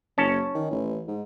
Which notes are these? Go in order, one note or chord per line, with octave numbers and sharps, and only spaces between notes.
F#1 C#4 A5
D#3
A1
G#2